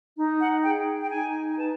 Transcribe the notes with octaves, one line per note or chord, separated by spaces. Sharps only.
D#4
F#5
G#4 G5
G5
D#4 G#5
G#5
B4 A5